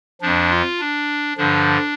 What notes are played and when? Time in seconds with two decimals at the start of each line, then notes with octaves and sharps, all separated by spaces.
0.21 F2 F3 D4
0.50 F4
0.80 D4
1.37 G2 D3 F3 D4